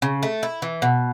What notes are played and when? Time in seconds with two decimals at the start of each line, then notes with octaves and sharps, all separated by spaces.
0.02 C#3
0.23 A3
0.43 E4
0.62 E3
0.82 B2